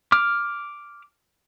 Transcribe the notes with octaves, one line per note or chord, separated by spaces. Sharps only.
D6 F6